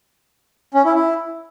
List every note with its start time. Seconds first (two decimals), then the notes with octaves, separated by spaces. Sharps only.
0.74 C#4
0.85 E4
0.95 E4